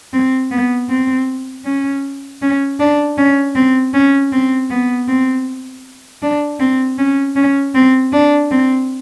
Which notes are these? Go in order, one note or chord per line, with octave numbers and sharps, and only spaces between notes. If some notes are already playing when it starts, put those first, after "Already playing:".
C4
B3
C4
C#4
C#4
D4
C#4
C4
C#4
C4
B3
C4
D4
C4
C#4
C#4
C4
D4
C4